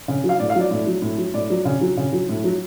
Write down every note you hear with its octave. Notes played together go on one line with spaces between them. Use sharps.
C#3
F#3
F5
A2 D5
F5
F#3 D5
A2
F#3
A2
F#3
A2 D5
F#3
C#3
F#3
C#3
F#3
A2
F#3